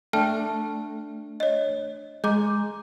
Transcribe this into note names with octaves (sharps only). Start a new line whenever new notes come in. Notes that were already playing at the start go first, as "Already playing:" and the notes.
A3 D4 G5 A5 F6
C#5 D#5
G#3 A#5 D6 G6